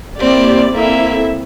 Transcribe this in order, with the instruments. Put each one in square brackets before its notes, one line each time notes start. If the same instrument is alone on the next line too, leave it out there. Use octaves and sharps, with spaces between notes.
[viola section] A#3 E4 G4 D5 [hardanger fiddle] C4
[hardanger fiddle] A#3 [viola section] C4 E4 A4 E5